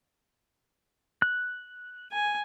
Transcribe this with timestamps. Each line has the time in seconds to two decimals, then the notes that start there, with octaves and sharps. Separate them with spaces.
1.22 F#6
2.12 G#5